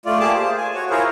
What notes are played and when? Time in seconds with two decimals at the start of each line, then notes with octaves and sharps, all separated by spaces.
0.05 A3 F4 D5
0.20 A#3 G4 G#4 A5 D6
0.33 C5
0.57 G#5
0.74 F#4 C#5
0.90 E4 F4 G#4 A#4 C5 C#5